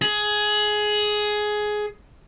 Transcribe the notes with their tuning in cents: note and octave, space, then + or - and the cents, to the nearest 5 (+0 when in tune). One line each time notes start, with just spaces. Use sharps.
G#4 +15